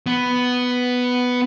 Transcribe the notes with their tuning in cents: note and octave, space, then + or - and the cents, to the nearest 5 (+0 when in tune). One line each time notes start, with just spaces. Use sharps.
B3 +5